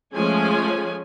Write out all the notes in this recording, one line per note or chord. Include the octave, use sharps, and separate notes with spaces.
F3 G#3 A3 C#4 G#4 G#5